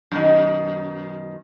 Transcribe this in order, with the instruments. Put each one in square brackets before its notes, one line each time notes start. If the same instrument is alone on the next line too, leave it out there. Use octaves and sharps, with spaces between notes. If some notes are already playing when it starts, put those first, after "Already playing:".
[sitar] F#2 B2 D#3